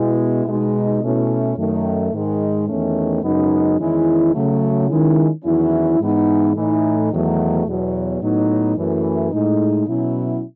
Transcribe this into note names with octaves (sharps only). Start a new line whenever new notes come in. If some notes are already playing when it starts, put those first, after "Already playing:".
Already playing: B2 G#3 B3 E4
B2 G#3 D#4
B2 A3 C#4 E4
F#2 D#3 A3
G#2 D#3 G#3
E2 D#3 A3 C#4
F#2 C#3 G#3 B3 D#4
E2 D#3 G#3 C#4 E4
C#3 F#3 A3
D#3 G#3 C#4 E4
E2 D#3 F#3 C#4 E4
G#2 E3 B3 D#4
A2 E3 A3 D#4
E2 D#3 F#3 A3
E2 B2 F#3
A2 F#3 B3 D#4
F#2 E3 A3
A2 G#3 D#4
B2 F#3 C#4 E4